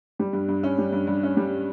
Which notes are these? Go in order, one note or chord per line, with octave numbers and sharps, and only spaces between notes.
G3
G2
G2
C#4
G3
G2
G2
C#4
G3